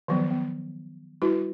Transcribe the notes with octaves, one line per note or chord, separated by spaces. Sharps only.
D#3 F3 F#3 B3
B3
G3 E4 F#4 B4